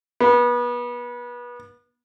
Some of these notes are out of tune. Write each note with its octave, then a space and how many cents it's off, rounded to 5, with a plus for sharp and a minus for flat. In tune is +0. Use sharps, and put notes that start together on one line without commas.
B3 -30